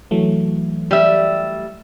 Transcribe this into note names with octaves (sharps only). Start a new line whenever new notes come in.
E3 F#3 A3
G3 E5